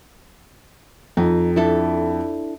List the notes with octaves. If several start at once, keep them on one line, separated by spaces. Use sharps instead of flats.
F2 D#4
D4 E4 A4